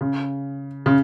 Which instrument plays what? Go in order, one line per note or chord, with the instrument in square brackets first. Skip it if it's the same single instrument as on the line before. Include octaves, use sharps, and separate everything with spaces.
[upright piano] C#3
C#3